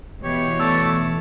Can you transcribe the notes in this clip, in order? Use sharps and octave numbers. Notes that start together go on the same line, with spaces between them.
B2 E3 G4 C#5
A3 D5 A5 C#6 E6